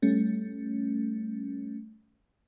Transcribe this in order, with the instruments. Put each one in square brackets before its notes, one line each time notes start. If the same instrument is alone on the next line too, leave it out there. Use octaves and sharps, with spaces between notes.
[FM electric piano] G3 A3 C#4